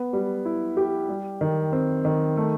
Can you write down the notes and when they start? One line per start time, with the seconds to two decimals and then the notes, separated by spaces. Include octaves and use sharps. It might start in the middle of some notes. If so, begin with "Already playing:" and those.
Already playing: B3
0.13 G3
0.45 E4
0.77 G4
1.09 G3
1.41 D#3
1.73 C4
2.05 D#3
2.37 A3